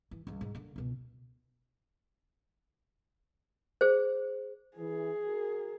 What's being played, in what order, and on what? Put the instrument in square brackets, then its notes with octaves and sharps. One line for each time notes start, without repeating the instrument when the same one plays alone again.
[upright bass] E3
C#2 G3
G#2
D3 A#3
C#2 B2
[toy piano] G#4 C5
[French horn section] E3 [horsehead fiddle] G#4
[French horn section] F#4 A#4